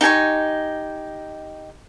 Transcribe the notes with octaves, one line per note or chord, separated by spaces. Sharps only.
D#4 G4 G#5 C#6